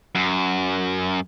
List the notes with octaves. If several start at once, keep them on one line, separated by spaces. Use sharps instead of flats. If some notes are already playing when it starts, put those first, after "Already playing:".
F#2